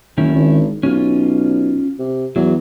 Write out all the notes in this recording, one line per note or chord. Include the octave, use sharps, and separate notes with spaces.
F#1 D#3 C#4 E4
G#1
B1 C#4 F4
C3
E2 F#3